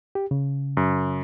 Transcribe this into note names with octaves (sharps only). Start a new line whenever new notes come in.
G4
C#3
F#2